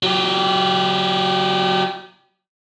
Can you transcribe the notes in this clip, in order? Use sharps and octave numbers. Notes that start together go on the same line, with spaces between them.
F#3 G4